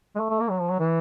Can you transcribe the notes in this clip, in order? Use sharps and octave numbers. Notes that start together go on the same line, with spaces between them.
G#3
A3
A3
A#3
F#3
F3
F#3
E3